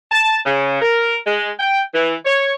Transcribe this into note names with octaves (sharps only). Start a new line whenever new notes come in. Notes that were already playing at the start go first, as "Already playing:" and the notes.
A5
C#3
A#4
G#3
G5
E3
C#5